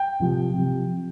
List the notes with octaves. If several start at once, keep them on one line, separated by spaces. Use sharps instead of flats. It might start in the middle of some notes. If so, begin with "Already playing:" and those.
Already playing: G5
C3 F3
C3
F3